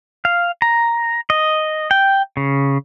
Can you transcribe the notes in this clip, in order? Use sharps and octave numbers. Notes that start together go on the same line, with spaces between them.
F5
A#5
D#5
G5
C#3